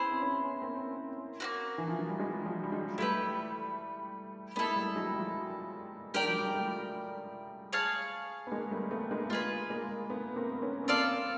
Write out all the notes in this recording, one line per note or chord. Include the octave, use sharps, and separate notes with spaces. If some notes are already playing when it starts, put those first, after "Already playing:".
Already playing: B3 C#4 E4 G#4 C5
C4
B3 C#4
A#3 C4
A#3 C#4 F#4
E3
F3
F#3
G3
F#3 G#3
F3 G3
G3
F#3 G#3
G3 A3 E4 G4 B4
G#3 A#3 B3 E4 A4
G3 A3
F#3 G#3
F3 G3
F#3 G#3 G4 A#4 D5 G5
F3
F#3
G3
G#3
G3 A3
G#4 C#5 F5 A5
B3
G#3 A#3
G3 A3
A3 B3
G#3 A#3
G#3 A#3 F4 G#4 B4
G#3 A#3
A3 B3
A#3 C4
B3 C#4
C#4
A#3 C4 F4 A4 D5 F5